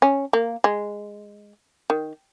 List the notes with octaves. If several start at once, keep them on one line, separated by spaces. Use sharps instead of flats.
C#4
A#3
G#3
D#3